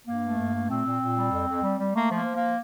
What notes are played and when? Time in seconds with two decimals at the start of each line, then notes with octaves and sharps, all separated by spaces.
0.07 G2 A#3
0.23 A3
0.38 G2
0.54 A3
0.70 A#2 C4
0.85 A#2
1.01 A#2
1.16 G3
1.32 F2
1.47 F2
1.63 G3
1.79 G3
1.94 A3 A#3
2.10 F3 A#3
2.25 F3
2.36 A#3